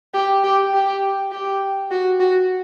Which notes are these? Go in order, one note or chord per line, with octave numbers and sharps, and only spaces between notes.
G4
G4
G4
G4
F#4
F#4